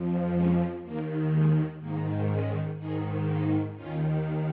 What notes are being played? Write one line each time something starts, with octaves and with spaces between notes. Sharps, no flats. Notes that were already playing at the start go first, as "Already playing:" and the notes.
Already playing: F2 F3
G#3 C#4
D#2 D#3 A#3
G#3
G#2 D#3 A#3
G#3 C#4
G#2 D#3 D#4 G#4
A#3 D#4
D#2 D#3 C#4 F4